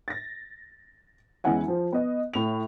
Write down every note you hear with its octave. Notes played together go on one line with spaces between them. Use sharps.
A6 A#6
E2 G#3 C#4 E4 F#5 G#5
F3
B3 D#5
A2 F7